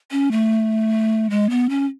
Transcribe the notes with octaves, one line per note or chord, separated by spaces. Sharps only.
C#4
A3
G#3
B3
C#4